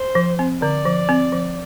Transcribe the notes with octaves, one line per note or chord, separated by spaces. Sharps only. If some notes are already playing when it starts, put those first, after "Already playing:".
Already playing: C5
F3
C4
D3 D5
F3
C4
F3